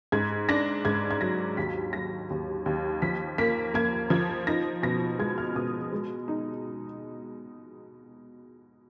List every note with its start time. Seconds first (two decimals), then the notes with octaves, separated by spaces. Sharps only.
0.12 G#2 G#6
0.49 D4 A#6
0.85 G#2 G#6
1.11 G#6
1.21 F#3 A#6
1.57 D#2 B6
1.93 F#3 A#6
2.30 D#2
2.66 D#2
3.02 F3 B6
3.38 A#3 B6
3.74 A#3 G#6
4.10 F3 G#6
4.47 D#4 A#6
4.83 B2 A#6
5.19 G#3 G#6
5.38 F6
5.55 B2 D#6
5.92 G#3
6.28 D#4